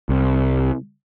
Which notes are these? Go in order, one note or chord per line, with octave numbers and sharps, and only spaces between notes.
C2